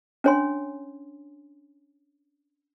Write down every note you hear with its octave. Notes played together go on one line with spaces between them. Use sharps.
C#4 D4 C#5 G#5 C6